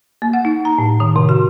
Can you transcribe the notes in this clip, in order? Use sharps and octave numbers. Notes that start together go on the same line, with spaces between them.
A#3
F#5
D#4
A#5
A2
D#3
C3
F#4